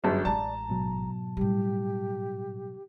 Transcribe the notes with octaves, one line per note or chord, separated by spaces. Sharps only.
G1 F#2 G#4
A1 G#3 D5 A5 A#5
G#2 B2 F#3
A2 G3 G4